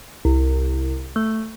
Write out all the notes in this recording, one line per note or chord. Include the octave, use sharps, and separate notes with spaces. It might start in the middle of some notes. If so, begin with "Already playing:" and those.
C2
A3